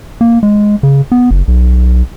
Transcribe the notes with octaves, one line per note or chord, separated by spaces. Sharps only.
A#3
G#3
C#3
B3
F#1
B1